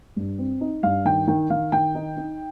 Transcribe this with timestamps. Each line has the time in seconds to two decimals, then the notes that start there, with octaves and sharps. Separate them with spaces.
0.16 G2
0.38 C4
0.61 D#4
0.83 G2 F5
1.05 D#3 G5
1.27 D#3 G5
1.50 D#3 F5
1.72 D#3 G5
1.95 D#4
2.17 D#4